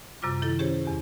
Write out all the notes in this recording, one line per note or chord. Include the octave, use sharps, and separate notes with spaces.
F#2 C3 G3 F4 D6
D#3 E4 A4 A6
C#4 G4 G#4 C5 C#5
E2 G4